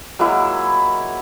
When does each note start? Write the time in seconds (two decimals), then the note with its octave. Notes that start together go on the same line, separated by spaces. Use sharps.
0.19 F#3 G#3 A#3 E4